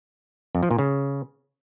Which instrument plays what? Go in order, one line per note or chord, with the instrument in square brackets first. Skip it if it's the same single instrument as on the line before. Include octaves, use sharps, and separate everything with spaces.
[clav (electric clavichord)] F2
F3
A#2
C#3